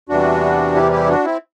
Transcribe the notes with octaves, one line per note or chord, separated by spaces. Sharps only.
E2 C3 E3 G3 D4 F#4
E4 G4
E4 G4
D4 F#4
C4 E4